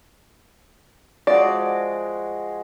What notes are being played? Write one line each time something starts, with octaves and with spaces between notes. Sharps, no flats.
F3 G#3 F#4 D5